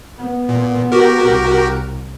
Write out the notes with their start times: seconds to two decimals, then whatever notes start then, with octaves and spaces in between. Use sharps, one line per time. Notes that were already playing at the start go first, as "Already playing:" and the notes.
0.18 B3
0.49 A#2
0.92 F#4 G4 A#4
1.25 C2